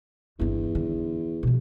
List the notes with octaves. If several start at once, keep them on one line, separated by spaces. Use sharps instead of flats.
G1 E2 C4
D3
B2 F3